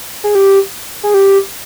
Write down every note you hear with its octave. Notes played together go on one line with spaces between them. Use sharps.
G#4
G4
G#4
G4